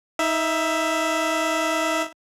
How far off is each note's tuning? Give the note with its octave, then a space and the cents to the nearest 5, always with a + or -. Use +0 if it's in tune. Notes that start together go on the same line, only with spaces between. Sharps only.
D#4 +30 E5 +10